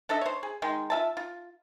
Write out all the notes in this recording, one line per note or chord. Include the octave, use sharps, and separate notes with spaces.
D4 A4 D#5 E5
C5 C#5
G#4
D#3 G#3 C6
F4 E5 A5
F4